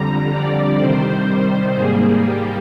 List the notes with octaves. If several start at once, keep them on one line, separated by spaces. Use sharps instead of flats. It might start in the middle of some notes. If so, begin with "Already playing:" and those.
Already playing: F2 D3 G3 A#5
D5
C3 D#3 G3 C5
G#2 G3 A#3 G#4
G4